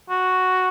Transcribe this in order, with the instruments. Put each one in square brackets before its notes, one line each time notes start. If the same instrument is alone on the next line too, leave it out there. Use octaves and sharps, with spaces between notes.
[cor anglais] F#4